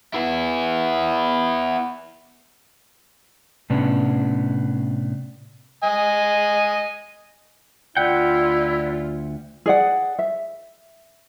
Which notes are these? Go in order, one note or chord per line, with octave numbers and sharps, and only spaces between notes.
B3 E4
A2 C3 B3 C#4 D4
D#5 G#5
D2 E4 F4 D5 F#5 G5
G#4 D5 F#5
E5